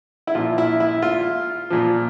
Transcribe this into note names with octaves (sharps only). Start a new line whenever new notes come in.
E4
A#2 F3 F4
E4
E4
F4
A#2 F3